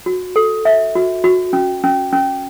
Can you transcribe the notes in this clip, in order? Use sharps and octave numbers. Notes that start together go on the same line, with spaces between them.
F#4
A4
E5
F#4
F#4
C#4
C#4
C#4